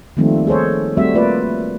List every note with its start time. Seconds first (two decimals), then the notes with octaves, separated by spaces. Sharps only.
0.17 D#3 F3 G3 A3 A#3 C4
0.47 G#4 A4 C5 C#5
0.97 G3 A3 C4 F#4 E5
1.15 A3 A#3 F4 B4 D5